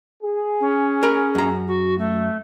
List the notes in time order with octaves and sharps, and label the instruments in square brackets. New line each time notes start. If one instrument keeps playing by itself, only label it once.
[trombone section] G#4
[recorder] C#4
[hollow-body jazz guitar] A#4 A#5 B5
F#2 A#5
[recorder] F#4
A3